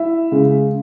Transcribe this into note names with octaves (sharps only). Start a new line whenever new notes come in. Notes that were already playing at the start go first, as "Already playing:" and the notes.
Already playing: E4 E5
C#3 G#3